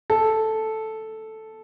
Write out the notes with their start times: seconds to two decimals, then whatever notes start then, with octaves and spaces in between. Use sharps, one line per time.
0.10 A4